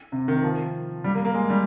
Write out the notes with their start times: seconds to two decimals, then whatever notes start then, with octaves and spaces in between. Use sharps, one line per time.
0.12 C3
0.28 D#3
0.43 F3
1.04 G3
1.15 A#3
1.25 A#3
1.34 G#3
1.50 G3